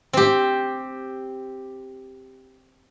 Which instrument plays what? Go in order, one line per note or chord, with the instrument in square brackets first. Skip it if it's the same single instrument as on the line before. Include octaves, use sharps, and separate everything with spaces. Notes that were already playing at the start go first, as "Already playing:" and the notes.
[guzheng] C4 G4